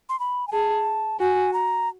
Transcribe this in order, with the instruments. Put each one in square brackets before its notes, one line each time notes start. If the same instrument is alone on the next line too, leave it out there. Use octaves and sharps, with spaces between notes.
[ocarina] C6
B5
G#5
[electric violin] G#4 [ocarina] A5
[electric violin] F#4 [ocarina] G#5
[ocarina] A#5